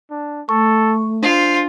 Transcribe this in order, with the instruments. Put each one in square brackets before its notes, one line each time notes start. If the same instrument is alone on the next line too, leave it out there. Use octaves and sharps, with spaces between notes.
[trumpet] D4
[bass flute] A3 [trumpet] A4 [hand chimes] C#6
[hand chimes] D4 C7 [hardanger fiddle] F4 [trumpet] C5